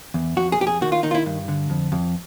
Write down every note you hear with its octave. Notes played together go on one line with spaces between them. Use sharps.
E2
F2 F#4
G#4
F2 G4
G#4
D#3 F#4
F4
D#3 D#4
F4
E4
G2
D3
F2
F2